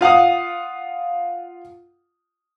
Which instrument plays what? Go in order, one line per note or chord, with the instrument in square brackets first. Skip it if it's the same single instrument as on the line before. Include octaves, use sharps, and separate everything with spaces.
[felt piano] F4 F5 F#5 D#6